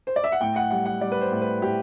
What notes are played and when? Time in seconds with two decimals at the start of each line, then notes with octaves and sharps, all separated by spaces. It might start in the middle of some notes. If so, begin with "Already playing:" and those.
0.07 C5
0.16 D5
0.24 E5
0.32 F#5
0.41 A2 G5
0.56 F#5
0.71 G3 F#5
0.86 F#5
1.01 G3 D5
1.12 B4
1.21 C5
1.31 A2
1.42 B4
1.62 A2 G4